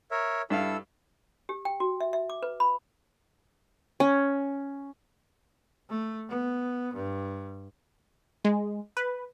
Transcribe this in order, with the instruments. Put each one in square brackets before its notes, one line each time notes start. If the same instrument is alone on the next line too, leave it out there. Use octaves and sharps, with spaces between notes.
[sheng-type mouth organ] A#4 C#5 E5
[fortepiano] G2 F5 [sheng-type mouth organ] E4 A4 E6
[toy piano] G4
G5
F#4
E5
E5
D6
B4
B5
[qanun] C#4
[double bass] A3
B3
G2
[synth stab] G#3
B4